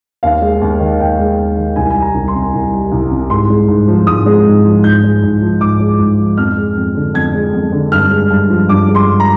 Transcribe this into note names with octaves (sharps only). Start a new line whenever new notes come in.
D#2 F5
G#3
D#2
D#3
D#2 G5
G#3
D#2
D#3
C2 G#5
G3 G#5
A#5
C2
C6
C3
C2
G3
C2
C3
G#2 C6
G#3
G#2
F3
G#2 D#6
G#3
G#2
F3
G#2 G6
G#3
G#2
F3
G#2 D6
G#3
G#2
F3
F2 F6
G#3
F2
D3
F2 G#6
G#3
F2
D3
G2 F6
G#3
G2
F3
G2 D6
G#3
C6
G2
A#5